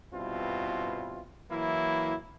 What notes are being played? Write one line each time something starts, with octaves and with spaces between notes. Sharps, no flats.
G2 B2 C4 E4 F4
E3 F#3 A#3 E4